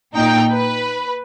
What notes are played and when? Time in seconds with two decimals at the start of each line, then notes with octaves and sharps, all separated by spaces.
0.15 A#2 D#4 G5
0.51 B4